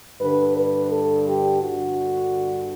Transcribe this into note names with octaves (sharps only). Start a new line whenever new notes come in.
G2 D3 B4
B4
A4
G4
G2 D3 F#4